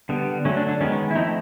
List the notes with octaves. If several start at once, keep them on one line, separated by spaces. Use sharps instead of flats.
D3 G3 B3
D3 F#3 A3 C#4
D4
D4
D#3 G#3 B3 C#4
C#4
E4
F3 A3 C4 D#4